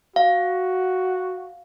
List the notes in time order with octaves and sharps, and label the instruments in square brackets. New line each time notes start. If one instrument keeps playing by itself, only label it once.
[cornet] F#4 [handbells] F5